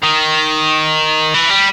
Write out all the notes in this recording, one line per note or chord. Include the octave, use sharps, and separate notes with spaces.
D#3
E3
G3